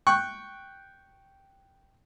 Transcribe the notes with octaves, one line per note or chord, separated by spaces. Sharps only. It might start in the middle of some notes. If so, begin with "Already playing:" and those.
G5 C#6 F#6